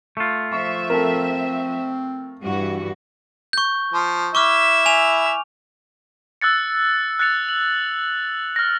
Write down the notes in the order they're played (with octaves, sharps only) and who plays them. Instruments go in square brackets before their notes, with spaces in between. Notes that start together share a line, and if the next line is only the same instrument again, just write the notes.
[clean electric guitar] A3 F4
[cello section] F3 E5 [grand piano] C#6
[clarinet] C4 [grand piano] A4 A#4
[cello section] G2 E3 F#4
[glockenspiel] C#6 G6
[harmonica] F3
[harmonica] E4 E5 [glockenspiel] C#6 D6 F6
[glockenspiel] G#5 F7
[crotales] E6 F#6 A6 C#7
F#6 A6 C#7 F7
F#7
F6 A#6